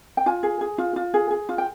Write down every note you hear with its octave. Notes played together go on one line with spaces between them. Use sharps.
G5
F4 G#5
G#4
G#4
F4
F4
G#4
G#4
F4
G5